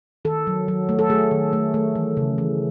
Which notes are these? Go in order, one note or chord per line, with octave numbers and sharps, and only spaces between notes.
D#3 A4
F#3
F#3
A3
A4
A3 G#4
D#3
A3
A3
E3
C#3
E3